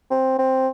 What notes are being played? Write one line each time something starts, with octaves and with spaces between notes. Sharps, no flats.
C4
C4